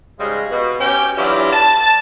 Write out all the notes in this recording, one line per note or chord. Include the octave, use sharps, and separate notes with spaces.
G#2 C#3 G3 G#3
B2
C#4 G4 G5
E3 F#3 D4 E4 F4 G4
A5